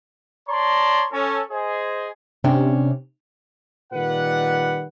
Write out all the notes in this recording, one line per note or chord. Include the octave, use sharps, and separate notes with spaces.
C#5 D5 A5 A#5 C6
C#4 A4
G#4 C5 D#5 G#5
C3 C#4 D4 G5
A#2 D#3 G3 B4 F#5